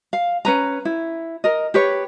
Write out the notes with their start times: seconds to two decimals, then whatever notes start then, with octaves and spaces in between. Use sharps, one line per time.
0.13 F5
0.45 C#4 B4 A#5
0.85 E4
1.44 A#4 D#5
1.74 G4 B4 C#5